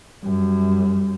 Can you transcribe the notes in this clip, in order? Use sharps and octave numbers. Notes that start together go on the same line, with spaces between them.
F#2 G3